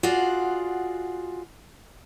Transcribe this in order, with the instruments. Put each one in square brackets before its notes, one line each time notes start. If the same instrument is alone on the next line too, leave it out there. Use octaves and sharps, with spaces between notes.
[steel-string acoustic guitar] F4 F#4 G#4 D5 F#5